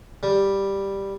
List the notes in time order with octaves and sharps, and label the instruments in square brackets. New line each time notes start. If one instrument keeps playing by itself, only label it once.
[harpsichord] G3